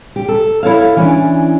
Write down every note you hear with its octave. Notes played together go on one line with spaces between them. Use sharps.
G4
A4
E4 A4 C#5 F5
E3 C#4 D4